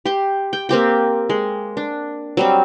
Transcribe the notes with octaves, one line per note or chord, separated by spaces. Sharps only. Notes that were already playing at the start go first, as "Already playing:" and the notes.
G4 C6
G5
A#3 C4 G4 G5
G#3
D4
F#3 G3 C4